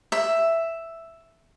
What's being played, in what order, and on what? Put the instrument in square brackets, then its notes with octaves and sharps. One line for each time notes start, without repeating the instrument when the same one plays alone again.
[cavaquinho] E5